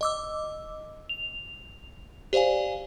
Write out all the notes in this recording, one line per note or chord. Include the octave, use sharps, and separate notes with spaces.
D#5 D6 E6
F7
G4 C5 D5 F5 G#5